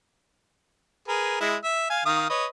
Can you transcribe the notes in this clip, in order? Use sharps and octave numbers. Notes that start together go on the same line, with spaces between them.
G#4 A#4 B4
G#3 E4
E5
F5 G#5
D#3 F5 D#6
B4 C#5 D#5